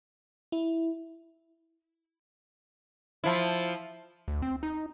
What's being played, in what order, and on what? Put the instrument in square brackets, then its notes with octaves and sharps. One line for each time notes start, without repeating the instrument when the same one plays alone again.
[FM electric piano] E4
[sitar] F3 E4
[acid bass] D2
C4
D#4